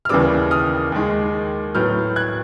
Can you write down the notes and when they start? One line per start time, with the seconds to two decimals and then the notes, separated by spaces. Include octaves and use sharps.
0.05 F6
0.09 D#2 C#3 E3 G3 B3 D6 E6
0.51 D#6 F6
0.92 D#2 D#3 G#3
1.75 A2 F#3 B3 F6 G6
2.16 F#6 G#6